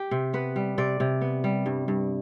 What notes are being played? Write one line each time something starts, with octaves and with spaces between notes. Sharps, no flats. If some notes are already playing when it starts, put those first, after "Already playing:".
Already playing: G4
C3
B3 B4
G3
C3 D5
C3
B3
G3
G2
G2